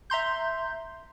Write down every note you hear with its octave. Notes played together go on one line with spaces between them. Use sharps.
E5 A#5 C6 G6